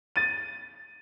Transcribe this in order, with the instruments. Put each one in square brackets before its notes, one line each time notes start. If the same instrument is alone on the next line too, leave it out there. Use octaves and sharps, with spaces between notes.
[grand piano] A6 D#7